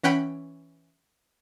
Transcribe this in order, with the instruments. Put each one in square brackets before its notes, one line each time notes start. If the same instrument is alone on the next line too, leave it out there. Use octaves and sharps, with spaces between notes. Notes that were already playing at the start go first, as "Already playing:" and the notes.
[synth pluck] E3 C#4 F#5 G5 B5 B6